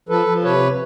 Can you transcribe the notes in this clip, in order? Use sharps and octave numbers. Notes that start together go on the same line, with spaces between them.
F3 A4 B4
F3
C3 B4 C#5